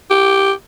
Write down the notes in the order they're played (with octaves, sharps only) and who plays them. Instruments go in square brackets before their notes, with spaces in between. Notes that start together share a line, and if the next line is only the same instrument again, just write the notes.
[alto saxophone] G4